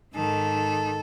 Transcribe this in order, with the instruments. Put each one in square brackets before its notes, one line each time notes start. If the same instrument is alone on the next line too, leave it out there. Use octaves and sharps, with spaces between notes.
[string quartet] G#2 D#3 A4